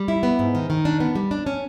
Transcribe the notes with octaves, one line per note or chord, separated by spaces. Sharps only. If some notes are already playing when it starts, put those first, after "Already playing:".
Already playing: G3
E4
B3
G#2
D#3
D#3
D4
B3
G3
D4
C#4